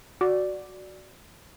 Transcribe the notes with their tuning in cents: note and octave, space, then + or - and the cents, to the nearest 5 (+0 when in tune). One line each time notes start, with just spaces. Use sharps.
F#4 +0 D5 +0